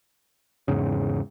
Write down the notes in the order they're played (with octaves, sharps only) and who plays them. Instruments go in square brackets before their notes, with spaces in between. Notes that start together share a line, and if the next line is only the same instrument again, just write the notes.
[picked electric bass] E2 G#2 C#3